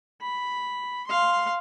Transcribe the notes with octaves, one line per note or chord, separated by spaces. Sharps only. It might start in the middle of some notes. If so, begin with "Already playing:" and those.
B5
F5 C6